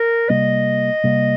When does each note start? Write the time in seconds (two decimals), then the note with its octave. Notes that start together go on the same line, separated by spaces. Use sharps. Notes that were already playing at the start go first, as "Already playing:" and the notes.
Already playing: A#4
0.29 C3 G3 A#3 D#5
1.04 C3 G3 A#3